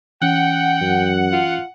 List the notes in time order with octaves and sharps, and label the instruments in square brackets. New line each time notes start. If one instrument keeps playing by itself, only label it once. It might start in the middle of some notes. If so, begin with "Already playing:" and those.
[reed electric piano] E3 C#4 [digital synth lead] F#5 [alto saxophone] G5
[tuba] F#2
[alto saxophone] F4